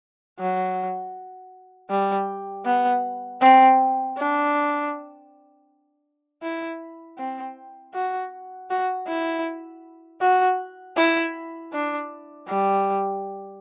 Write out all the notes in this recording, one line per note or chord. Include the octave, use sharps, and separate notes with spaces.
F#3
G3
B3
C4
D4
E4
C4
F#4
F#4
E4
F#4
E4
D4
G3